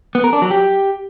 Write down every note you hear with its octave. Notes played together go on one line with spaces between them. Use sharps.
B3
A#4
D4
F#3
G4